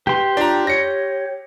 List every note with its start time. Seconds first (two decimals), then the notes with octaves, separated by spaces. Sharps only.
0.07 G4 B4 C6
0.37 D4 F4 A#5
0.67 C#5 A#6 C#7